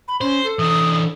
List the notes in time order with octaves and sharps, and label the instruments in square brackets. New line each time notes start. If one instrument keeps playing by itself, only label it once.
[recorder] B5
[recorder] C#4 [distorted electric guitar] C5
[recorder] A4
[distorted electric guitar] E3 D4 [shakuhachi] D#6